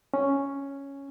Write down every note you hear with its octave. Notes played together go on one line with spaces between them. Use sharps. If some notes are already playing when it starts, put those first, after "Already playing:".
C#4